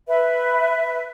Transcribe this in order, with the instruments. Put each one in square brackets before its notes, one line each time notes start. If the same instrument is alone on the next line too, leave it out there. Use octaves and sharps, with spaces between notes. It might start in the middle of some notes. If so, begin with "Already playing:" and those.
[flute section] B4 E5